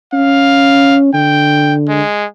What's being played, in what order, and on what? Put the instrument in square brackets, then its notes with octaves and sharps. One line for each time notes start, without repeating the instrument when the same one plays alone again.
[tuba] C#4 [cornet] F5
[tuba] D3 [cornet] G5
[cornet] G#3